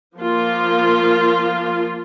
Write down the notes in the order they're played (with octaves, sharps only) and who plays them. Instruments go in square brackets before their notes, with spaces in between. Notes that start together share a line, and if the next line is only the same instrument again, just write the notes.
[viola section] F3 A#3 F4